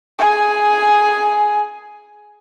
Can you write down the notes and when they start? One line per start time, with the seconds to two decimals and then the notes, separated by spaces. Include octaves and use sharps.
0.19 G#4 G#5